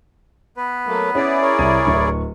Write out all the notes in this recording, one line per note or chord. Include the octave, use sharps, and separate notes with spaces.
B3 B4
F#3 A3 A#3
C#4 E4 G#4 D5
A#4 C#5
C2 D#7
D1 C#6